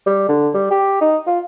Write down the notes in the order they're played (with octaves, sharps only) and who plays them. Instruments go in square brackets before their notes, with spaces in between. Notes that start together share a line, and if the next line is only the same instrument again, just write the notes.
[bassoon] G3
D3
G3
G4
D#4
F4